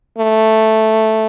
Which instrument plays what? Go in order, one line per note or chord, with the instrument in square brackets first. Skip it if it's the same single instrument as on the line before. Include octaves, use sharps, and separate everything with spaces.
[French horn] A3